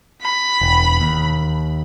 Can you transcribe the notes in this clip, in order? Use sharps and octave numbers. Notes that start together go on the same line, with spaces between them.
B5
E1
D#2